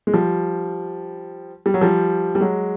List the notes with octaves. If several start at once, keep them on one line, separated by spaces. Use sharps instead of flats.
G#3
F3 G3
G3
F#3
F3 G3
G3
F#3 G#3